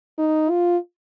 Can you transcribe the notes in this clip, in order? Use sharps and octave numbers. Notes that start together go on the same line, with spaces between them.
D#4
F4